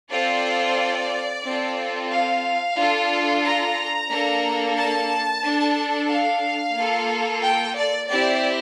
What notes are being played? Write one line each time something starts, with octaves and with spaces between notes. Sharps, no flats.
C4 F4 A4 D5
C4 F4 A4
F5
D4 F4 A4
A#5
A#3 D4 A4
A5
D4 A4
F5
A#3 F4 A4
G5
D5
C4 E4 G4 D5